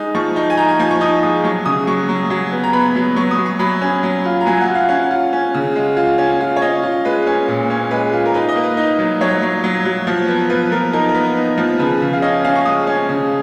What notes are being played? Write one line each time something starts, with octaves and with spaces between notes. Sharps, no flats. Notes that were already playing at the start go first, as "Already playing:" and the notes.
Already playing: G#3 D#4 D#6
F3 C#6
D#4 C#6
G#5
D#4 A#5
G#5
F3 G#5
C#6
D#4 D#6
G#3 D#6
F#3 C#6
C#3 D#6
F#3 C#6
F#3
F#3
B3
A#5
B3 B5
F#3
F#3 C#6
D#6
F#3
C#6
F#3 B5
C#4
F#3
F4
A#5
F#3 G#5
F#5
F4
F5
C#4 F#5
F4
C#4
C#3
G#3
F4
C#4
F4
C#5
C#4 D#5
F4
G#3 B4
C#4
A#2
C#4
G#3 B4
F4
A#4
D#4 B4
D#5
A#3
B4
D#4
F#3
F#3 C#5
F#3
F#3
F#3
F3
B3
F3 B4
F3 A#4
D#4 A#4
A#4
B3
D#4
F3
C#3 B4
C#3
F5
C#4 D#5
C#4 F5
C#6
G#3 D#6
C#4
C#3